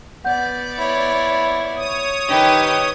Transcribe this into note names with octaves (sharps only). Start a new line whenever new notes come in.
B3 D5 F#5 G6
E4 C#5
C#5 D#6
D#3 G4 B4